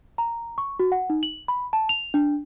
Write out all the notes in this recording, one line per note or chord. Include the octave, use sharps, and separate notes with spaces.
A#5
C#6
F#4
F#5
D#4
F#7
B5
A5
F7
D4